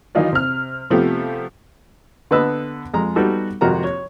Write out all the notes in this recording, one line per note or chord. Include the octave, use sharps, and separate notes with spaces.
D#3 E3 F#3 D#4 F4 D5
C3 F6
C3 F3 A3 B3 G4
D3 B3 A4 B4 D#5 E6
F2 G#3 A#5
G3 B3 D#4 F#4 A4
G#1 F2 C3 F#4 A#4 A#5
C#5